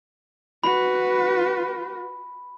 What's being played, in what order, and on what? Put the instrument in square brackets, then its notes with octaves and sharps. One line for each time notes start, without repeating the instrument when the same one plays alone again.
[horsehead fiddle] F#4 B4 [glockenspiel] B5